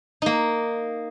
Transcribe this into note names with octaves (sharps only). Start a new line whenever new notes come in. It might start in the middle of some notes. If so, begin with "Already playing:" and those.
A#3 D#4